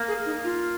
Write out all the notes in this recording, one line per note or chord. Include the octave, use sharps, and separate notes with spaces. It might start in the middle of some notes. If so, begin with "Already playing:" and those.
Already playing: A#3
G#4
D#4
F4